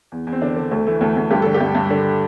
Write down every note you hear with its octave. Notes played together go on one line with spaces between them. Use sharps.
E2
E2
C4
D3 D4
D3
D2 A3
E3 A3
D2 A3
D2
G2 G4
D3 A4
G4
G2
G2
D3